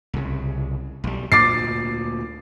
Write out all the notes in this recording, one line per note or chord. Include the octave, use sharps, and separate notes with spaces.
C2 C#3
B1 G3
D2 A#2 D6 A6 C7